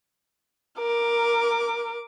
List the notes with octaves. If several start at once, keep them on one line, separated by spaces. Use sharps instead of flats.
A#4 D6